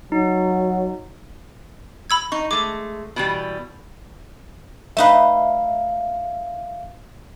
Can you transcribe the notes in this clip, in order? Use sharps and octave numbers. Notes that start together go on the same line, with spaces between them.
F#3 D#4
B5 E6 G#6
D#4 C#6
G#3 A3 D6
B2 E3 G3
A3 D#4 B4 E5 F5